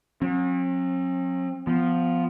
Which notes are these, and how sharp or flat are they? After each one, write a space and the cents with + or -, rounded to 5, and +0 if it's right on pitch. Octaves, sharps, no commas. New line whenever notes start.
F#3 -45 C4 +45
F3 +0 B3 +20